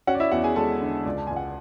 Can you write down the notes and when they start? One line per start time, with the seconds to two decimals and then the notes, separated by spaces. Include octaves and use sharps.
0.07 C#4 F#4 F#5
0.15 D5
0.20 E4 E5
0.32 E2 F#4 F#5
0.44 G#4 G#5
0.56 G#3 A4 A5
0.81 D3
1.05 C#2 D5
1.18 A5
1.27 C#2 G#5
1.36 F#5